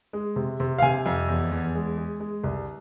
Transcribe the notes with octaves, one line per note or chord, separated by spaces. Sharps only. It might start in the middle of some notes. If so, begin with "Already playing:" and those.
G#3
C3
C3
F5
C3 G#5
F2
E2
E2
G#3
G#3
G#3
C2